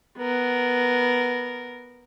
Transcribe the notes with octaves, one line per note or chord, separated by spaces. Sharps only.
B3 A#4